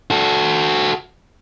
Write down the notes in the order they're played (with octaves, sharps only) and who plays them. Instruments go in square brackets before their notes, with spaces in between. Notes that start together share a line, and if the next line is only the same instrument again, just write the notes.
[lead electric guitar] F#4 A4